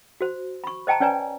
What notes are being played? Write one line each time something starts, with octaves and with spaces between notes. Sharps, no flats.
F#4 C5
B5 C#6
C5 D#5 G5 A5 A#5
C#4 B4 C#5 D5 G#5 A#5